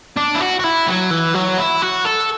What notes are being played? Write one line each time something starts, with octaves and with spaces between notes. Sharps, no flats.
D4
E4
F#4
F#4
E4
F#3
E3
F#3
E4
F#4
A4